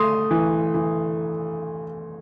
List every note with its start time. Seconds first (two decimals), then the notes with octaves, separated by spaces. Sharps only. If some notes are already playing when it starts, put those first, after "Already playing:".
Already playing: A3 C6 D#6
0.31 E3
0.74 E3